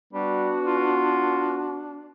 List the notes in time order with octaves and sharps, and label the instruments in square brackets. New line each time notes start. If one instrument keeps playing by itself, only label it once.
[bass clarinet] G3 [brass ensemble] B3 F#4 [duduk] D4
[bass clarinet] F4